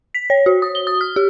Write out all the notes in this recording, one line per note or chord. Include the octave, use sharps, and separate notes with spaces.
B6
C#5
F#4
D#6
G7
D#6
F6
G4